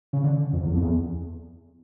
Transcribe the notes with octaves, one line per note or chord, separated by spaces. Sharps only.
C#3
D3
F2
E2
F2
E2